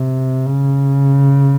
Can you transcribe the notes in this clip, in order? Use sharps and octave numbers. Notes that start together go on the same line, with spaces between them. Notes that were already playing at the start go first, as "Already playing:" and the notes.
Already playing: C3
C#3